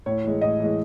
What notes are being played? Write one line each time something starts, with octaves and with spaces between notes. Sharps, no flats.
A2 C#5
E3 G#3
A2 D#5
E3 G#3